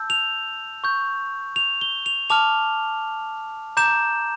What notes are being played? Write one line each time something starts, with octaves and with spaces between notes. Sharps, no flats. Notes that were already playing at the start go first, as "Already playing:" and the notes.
Already playing: A5 E6 G6
F7
C#6 G6
F7
G7
F7
A5 D6 F6 F7
A#5 D6 G6 E7